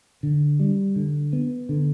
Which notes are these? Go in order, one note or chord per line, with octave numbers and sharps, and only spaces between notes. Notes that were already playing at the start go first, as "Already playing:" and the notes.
D3
G3
D3
B3
D3